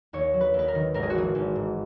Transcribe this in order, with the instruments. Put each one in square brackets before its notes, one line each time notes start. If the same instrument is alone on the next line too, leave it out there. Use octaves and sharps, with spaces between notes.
[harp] D#2 C#5
F#3
B4
D#2
B4
A#4
D#3
G#1 A#4
G#4
F#4
E3 G#4
G#1
G#2